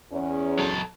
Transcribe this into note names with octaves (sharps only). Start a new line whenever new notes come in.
E2 C#4
F#3 A4